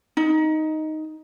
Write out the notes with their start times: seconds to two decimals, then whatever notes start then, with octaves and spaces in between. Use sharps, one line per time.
0.17 D#4